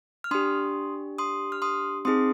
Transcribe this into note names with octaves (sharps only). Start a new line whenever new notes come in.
F6
D4 G4 C6 D#6
C6 D#6
F6
C6 D#6
C4 D#4 G#4 C6 D#6